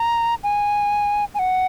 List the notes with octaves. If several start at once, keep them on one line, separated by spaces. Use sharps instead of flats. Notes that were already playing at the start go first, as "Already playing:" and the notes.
Already playing: A#5
G#5
G#5
F#5